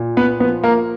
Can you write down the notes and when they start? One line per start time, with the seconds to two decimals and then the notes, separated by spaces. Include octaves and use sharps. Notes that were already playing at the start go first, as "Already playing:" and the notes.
Already playing: A#2
0.17 B3 B4
0.40 F3 B3 B4
0.64 A#3 A#4